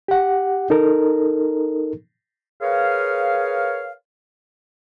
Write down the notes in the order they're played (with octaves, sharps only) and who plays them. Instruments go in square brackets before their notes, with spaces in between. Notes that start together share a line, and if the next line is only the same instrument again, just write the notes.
[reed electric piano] G4 F#5
D#4 A4 A#4
[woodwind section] G#4 A#4 B4 C#5 F5